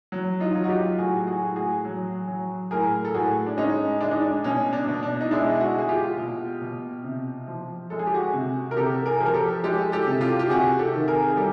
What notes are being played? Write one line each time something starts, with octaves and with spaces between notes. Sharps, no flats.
F#3
D#4 F4
F#3
F#4
F4 G4
A2 F#4 G#4
F#4 G#4
A2
F#4 G#4
F#3
F#3
A2 G#4 A#4
A4
A2 F#4 G#4
D4
G#3 C#4 D#4
G#3 D4
D#4
D4
B2 C#4
D4
B2
D4
D#4
G#3 D4 E4
E4 F#4
G#3 G#4
F4 G4
B2
B2
C3
F3
G#3 A4
G#4
G4
F#4 G#4
C3
A#4
C3 G4 A4
G#4 A#4
F3
A#4
G4 A4
G#3 G4 A4
G4 A4
C3
F4 G4
G4
C3 F#4 G#4
G4 A4
D#3
G#4 A#4
G#4
G3 G4 A4